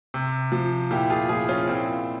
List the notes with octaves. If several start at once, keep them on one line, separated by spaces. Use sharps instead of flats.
C3
F3
A#2 E4 G4
F4 G#4
F3 F4 G#4
C#4 F4
A#2 C4 E4